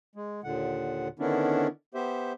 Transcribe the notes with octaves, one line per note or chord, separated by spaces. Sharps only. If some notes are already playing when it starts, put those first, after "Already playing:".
G#3
D#2 A#2 D3 F#5
D3 D#3 B3 C#4 D4 E4
B3 G4 C5 E5